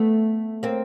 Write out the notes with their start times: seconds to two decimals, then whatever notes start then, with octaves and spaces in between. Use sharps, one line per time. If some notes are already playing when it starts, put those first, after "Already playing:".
Already playing: A3 B3
0.63 A#3 C4